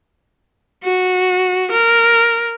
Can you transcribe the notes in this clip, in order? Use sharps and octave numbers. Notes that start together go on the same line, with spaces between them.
F#4
A#4